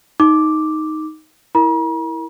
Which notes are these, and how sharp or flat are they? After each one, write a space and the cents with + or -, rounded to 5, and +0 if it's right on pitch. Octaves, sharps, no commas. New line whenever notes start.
D#4 +5 D6 +0
E4 -10 A#4 +0 A#5 +45